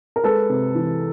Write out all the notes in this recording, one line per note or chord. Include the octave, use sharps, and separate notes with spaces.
A#4
G#3 A4 B4
C3
E3